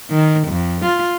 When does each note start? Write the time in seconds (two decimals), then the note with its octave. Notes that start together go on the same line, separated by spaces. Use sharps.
0.10 D#3
0.48 F2
0.85 F4